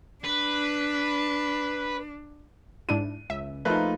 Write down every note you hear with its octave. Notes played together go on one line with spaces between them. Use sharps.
D4 B4
G#2 D4 E4 D#7
C#2 E5
F3 A3 A#3 D#4 F4 B4